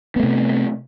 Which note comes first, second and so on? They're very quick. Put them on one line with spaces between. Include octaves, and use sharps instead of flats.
B3 A3 C3